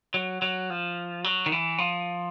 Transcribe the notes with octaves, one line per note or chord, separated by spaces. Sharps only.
F#3
F#3
F3
F#3
D#3
E3
F3